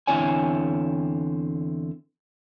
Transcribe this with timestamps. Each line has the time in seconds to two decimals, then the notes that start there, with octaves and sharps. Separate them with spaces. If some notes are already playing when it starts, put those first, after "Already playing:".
0.07 E2 D3 C4 E4 C#5 G#5